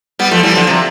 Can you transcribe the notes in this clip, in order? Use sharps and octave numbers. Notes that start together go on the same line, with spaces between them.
G3 B3
F3 A3
E3 G3
D3 F3
C3